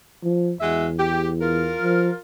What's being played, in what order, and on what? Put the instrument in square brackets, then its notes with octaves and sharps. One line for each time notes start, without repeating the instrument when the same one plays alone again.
[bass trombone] F3
[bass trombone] E2 [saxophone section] G#3 F#4 E5
[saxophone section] G4
F4 A#4
[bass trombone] F3